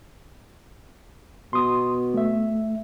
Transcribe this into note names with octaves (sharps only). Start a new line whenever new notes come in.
B2 C6 D#6
A3 E5